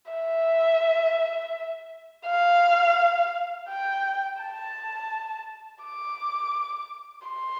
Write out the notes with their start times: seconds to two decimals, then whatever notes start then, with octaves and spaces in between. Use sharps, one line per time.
0.11 E5
2.26 F5
3.69 G5
4.41 A5
5.84 D6
7.27 C6